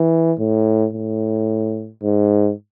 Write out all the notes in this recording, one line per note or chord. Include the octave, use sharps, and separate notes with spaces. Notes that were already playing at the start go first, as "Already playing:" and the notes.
Already playing: E3
A2
A2
G#2